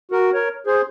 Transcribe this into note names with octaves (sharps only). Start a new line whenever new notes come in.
F#4 A#4
A#4 C#5
G#4 C5